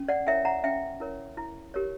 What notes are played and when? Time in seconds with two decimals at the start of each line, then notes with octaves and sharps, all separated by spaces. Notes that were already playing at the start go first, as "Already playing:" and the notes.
Already playing: C#4
0.08 D5 F#5
0.27 E4 A#4 C#5 E5 G5
0.45 F#5 A#5
0.63 C#4 E5 G5
1.00 E4 A#4 C#5
1.37 E4
1.74 G4 A#4 C#5